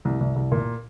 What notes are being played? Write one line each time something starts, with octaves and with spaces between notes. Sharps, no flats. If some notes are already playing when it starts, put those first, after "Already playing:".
C2
C2
C2
A#2